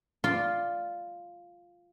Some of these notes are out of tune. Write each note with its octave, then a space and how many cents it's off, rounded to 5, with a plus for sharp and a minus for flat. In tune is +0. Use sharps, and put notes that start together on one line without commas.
F4 +0 D5 +0 C6 +0